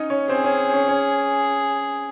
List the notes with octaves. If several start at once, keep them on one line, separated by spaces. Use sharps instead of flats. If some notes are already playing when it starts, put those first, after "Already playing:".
Already playing: C#4 D#4 C#5 D#5
C#4 C#5
C4 G#4 C5
C#4 C#5
C5
C#4 C#5
C#4 C#5